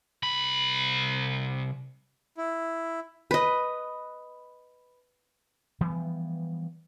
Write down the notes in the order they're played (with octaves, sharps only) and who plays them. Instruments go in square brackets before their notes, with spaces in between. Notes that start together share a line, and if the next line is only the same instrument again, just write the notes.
[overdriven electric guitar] C2 B5
[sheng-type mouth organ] E4
[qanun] B4 D#5
[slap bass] E3 F3 G3 B3